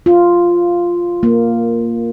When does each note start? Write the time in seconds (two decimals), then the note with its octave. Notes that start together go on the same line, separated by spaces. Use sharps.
0.06 F4
1.23 A#3